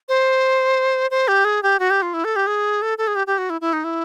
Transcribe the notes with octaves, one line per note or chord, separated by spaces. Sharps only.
C5
C5
G4
G#4
G4
F#4
G4
F4
E4
A4
G4
G#4
A4
A4
G#4
G4
G4
F#4
E4
E4
D#4
E4